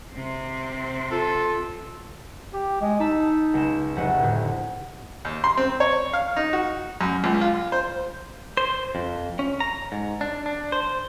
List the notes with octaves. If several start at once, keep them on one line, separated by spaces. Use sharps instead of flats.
C3 C4
F4 A4
G4
G#3
D#4 A5 B5 E6
C#2 E7
F1 F#5
D2 A2
D#2
C6
C4
C#5
F5
D#4
F#4
F#2
C#2
F4
C5
C5
F2
C#4
A#5
G#2
D4
D4
C5